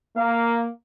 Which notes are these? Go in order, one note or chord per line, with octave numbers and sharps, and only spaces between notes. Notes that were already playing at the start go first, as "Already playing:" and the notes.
A#3 F5